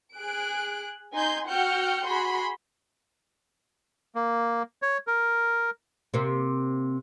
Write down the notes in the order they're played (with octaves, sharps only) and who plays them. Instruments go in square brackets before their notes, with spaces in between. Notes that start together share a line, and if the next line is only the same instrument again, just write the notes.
[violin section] G#4 F#6 D7
D#4 G#5 C6 G6
F#4 F#5 G5 F6 G6 C#7
F#4 G#4 B5 C6
[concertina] A#3
C#5
A#4
[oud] C3 A#3